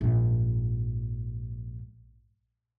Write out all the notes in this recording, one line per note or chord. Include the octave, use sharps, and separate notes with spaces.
A#1 G#2